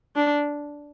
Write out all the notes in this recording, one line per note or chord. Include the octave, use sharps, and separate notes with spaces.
D4